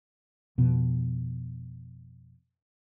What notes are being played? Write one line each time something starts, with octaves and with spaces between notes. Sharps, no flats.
F2 B2